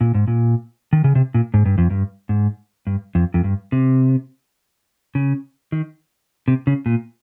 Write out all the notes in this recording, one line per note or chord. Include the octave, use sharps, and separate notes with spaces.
A#2
G#2
A#2
D#3
C#3
C3
A#2
G#2
G2
F2
G2
G#2
G2
F2
F2
G2
C3
C#3
D#3
C3
C#3
A#2